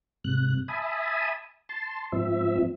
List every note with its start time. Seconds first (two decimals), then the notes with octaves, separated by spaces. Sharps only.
0.24 G#2 C3 F#6
0.68 E5 G#5 A5 B5 D#6
1.69 A5 C6
2.12 G#2 F3 C4 E5